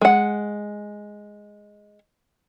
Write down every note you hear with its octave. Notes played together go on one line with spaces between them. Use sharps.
G#3 F#5